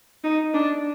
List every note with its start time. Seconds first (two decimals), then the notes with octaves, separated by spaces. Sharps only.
0.24 D#4
0.54 D4